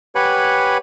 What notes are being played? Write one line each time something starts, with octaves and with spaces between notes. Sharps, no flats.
G4 B4 C#5 F#5 G#5 B5